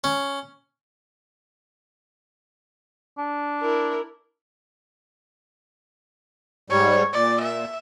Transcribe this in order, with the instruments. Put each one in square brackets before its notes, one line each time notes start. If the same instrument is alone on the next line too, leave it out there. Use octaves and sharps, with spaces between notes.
[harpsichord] C#4
[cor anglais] D4
[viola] E4 A#4
[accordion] G#2 G3 [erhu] C#5
[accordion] A#2 [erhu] D5
[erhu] E5